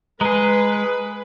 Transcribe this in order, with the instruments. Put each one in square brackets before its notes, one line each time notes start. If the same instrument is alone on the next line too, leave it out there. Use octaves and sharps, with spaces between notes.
[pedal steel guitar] G#3 G#4 [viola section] B4 [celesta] A#5